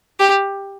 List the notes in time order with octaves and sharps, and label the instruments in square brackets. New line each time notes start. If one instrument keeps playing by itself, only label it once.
[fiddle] G4